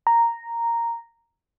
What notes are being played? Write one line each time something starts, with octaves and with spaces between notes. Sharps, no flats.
A#5